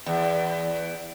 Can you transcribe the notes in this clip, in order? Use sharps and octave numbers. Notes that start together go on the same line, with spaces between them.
E2